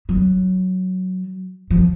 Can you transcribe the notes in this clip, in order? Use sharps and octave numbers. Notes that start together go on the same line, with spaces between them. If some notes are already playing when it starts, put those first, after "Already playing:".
F#3
F3